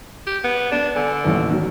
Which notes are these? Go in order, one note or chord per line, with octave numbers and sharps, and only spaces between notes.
G4
B3
B3 D4
D3 G#5
A1 D#2 B4
D#3 F#3